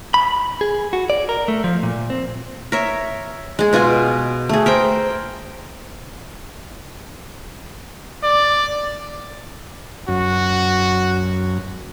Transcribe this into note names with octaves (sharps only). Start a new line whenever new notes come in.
B5
G#4
F#4
D5
A#4
A3
F3
A#2
C4
A#4 C#5 E5
G#3 G#4
B2 F4 F#4 G#5
A3 G#4
A#4 C5 G5
D5
F#2 F#4